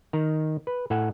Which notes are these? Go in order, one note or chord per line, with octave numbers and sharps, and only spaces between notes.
D#3 A#5
B4
A2 A4 F#5 G#5